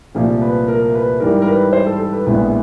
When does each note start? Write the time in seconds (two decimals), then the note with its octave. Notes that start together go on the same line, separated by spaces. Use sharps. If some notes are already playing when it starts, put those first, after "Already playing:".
0.15 C2 A#2 F3 A3
0.42 B4
0.68 A#4
0.95 B4
1.20 G#2 E3 G3 A#4
1.42 A#4
1.47 B4
1.73 C5
1.86 A4
1.99 A4
2.12 B4
2.26 A#1 A2 E3 G#3 B3 B4